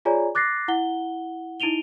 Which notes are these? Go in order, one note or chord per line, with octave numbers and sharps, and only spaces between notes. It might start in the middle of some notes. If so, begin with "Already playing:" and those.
F4 G#4 C#5 D5 G#5 A#5
D6 F#6 A6 A#6 C7
E4 F#5 G7
D#4 E4 D7 D#7 F7 G7